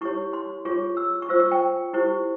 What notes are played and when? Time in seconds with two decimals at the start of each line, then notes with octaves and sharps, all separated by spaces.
0.01 E4 G4 C#5 C#6
0.33 C6
0.65 F4 G#4 C#5 C#6
0.97 E6
1.22 C#6
1.29 F4 C5 E6
1.40 C#6
1.51 G5
1.93 E4 G4 C5 C#6